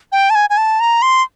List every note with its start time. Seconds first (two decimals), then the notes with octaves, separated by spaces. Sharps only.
0.12 G5
0.30 A5
0.35 G#5
0.50 G#5
0.57 A5
0.80 A#5
1.02 C6